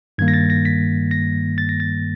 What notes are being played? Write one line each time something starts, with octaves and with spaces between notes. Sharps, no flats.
G2 D#3 G3 A#3 G#6
A#6
A6
A#6
B6
A#6
A6
A#6
A6